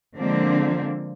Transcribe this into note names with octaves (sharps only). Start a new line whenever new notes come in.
D3 F3 G#3 A#3 C4 D4